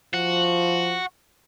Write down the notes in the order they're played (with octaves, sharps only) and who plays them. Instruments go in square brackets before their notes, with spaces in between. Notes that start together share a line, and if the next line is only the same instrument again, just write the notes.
[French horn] F3 [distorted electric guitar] F#4